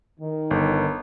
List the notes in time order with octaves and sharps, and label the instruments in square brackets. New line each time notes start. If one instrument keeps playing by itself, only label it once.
[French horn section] D#3
[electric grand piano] G1